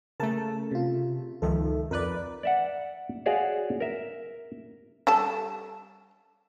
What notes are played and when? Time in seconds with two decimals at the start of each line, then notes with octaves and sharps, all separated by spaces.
0.20 C#3 A3 A#4 A5
0.71 C3 F4
1.42 C#2 D#3 F3 A4 E5
1.91 F2 A#4 B4 D5
2.43 D5 E5 F#5
3.26 F#4 G#4 C#5 D5 E5 F5
3.80 A#4 E5
5.07 G3 A4 A5